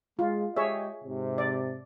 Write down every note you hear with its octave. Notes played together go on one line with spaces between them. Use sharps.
G#3 F4
G#3 G4 G#4 C#5 D#5 E5
G#2 C3
D5